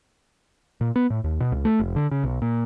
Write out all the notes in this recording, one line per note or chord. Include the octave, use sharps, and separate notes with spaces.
A#2
B3
A2
D#2
B2
C#2
A3
F1
D3
C#3
B1
A#2